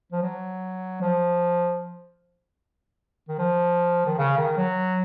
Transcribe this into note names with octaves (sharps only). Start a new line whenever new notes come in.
F3
F#3
F3
D#3
F3
D#3
C#3
D#3
F#3